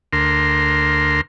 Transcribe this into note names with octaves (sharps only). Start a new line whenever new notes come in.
D2 A#4 C6